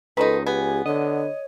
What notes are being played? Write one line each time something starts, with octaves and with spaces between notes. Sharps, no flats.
C#2 D#3 F3 D#4 A4 B4
B3 G4 G#5
D3 C#5 D#5